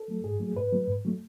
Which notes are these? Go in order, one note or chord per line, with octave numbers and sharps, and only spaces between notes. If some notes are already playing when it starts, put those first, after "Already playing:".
Already playing: A4
F#3 A3
G#2 G#4
F#3 A3
G#2 B4
F#3 A3
G#2
F#3 A3